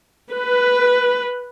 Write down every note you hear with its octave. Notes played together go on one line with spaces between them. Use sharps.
B4